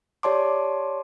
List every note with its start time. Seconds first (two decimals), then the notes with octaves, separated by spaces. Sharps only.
0.23 G4 C#5 D5 A5 C6 D6